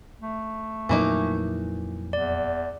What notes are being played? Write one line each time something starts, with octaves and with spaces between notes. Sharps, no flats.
A3
F2 A#2 E3 F#3 A#3 D#4
E2 D5